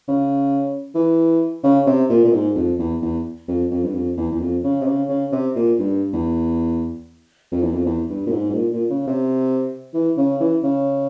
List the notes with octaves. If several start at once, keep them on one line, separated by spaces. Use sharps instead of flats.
C#3
E3
C#3
C3
A#2
A#2
G#2
F2
E2
E2
F2
F2
G2
F2
E2
E2
F2
C#3
C3
C#3
C#3
C3
A#2
G2
E2
F2
E2
F2
E2
G2
A#2
G#2
G#2
A#2
A#2
C#3
C3
E3
C#3
E3
C#3